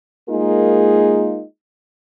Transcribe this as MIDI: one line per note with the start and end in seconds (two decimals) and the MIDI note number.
0.29 1.42 56
0.29 1.42 58
0.29 1.42 63
0.29 1.42 65
0.29 1.42 68
0.29 1.42 70